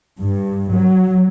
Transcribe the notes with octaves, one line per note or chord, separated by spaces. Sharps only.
G2
F#3